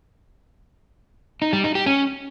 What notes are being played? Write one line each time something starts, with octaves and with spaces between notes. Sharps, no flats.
D#4
G3
D#4
G4
C#4